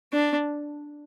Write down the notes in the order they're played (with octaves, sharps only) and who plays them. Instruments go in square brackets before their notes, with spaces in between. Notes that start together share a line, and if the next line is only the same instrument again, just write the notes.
[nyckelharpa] D4